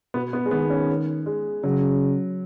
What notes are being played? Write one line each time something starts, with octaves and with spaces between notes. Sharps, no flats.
B2 B3
B3
G#3
D#3 B3
C#4
G#3
C#3 F#3